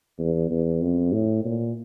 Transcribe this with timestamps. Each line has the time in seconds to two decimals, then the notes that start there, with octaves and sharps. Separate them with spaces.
0.19 E2
0.51 E2
0.82 F2
1.12 A2
1.45 A#2